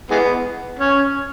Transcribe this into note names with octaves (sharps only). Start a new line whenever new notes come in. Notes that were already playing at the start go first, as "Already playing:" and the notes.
E3 G#3 B3
C#4